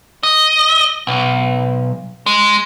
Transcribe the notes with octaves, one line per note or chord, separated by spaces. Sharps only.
D#5
B1
G#3